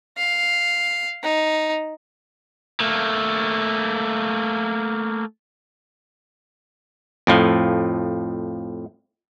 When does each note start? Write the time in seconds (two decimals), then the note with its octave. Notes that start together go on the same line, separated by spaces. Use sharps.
0.17 F5
1.23 D#4
2.80 A3 A#3
7.27 F2 A2 F3